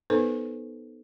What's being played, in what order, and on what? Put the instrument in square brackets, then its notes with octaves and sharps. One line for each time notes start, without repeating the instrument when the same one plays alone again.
[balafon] B3 D#4 A4 B4 C5